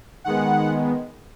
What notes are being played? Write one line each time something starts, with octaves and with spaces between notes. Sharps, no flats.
D#3 G#3 B3 F#5